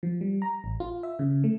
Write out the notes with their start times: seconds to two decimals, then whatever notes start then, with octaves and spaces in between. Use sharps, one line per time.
0.03 F3
0.21 G3
0.42 A#5
0.64 A1
0.80 F4
1.03 E5
1.19 C#3
1.44 A3